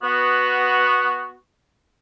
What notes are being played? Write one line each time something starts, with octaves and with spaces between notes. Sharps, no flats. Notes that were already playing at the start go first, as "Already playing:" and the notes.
B3 F#4